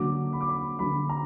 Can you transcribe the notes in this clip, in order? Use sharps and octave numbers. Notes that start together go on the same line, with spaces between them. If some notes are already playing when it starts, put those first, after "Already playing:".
Already playing: D3 F#3 A#3 D6
B5
D6
B5
D3 F#3 A#3 B5
A#5